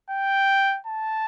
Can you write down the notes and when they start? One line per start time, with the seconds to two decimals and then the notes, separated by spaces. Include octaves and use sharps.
0.10 G5
0.87 A5